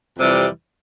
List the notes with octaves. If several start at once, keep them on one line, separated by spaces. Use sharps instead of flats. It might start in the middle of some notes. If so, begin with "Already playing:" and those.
F2 C3 E3 G3